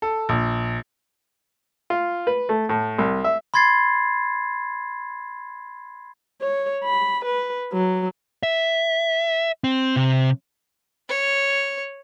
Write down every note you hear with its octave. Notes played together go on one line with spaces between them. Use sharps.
A4
A#1
F4
B4
A3
A2
C2
E5
B5 C6 G#6 A6 C7
C#5
B5
B4
F#3
E5
C4
C3
C#5